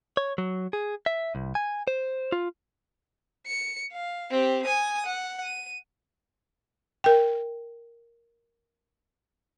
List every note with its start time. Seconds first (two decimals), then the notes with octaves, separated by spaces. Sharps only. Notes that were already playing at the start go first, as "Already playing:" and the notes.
0.17 C#5
0.38 F#3
0.73 G#4
1.06 E5
1.35 C2
1.55 G#5
1.88 C5
2.32 F4
3.47 C#7
3.93 F5
4.30 C4 G4
4.65 G#5 D#6
5.06 F#5
5.43 D#7
7.04 A#4 G5